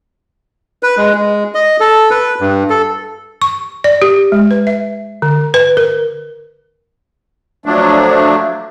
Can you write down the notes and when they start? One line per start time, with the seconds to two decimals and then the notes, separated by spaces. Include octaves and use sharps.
0.83 B4
0.97 G#3
1.14 G#3
1.55 D#5
1.80 A4
2.11 B4
2.40 G2
2.70 A4
3.42 C#6
3.84 D5
4.02 G4
4.32 G#3
4.51 B4
4.67 E5
5.22 D3
5.54 B4
5.77 A#4
7.66 F3 F#3 A3 D4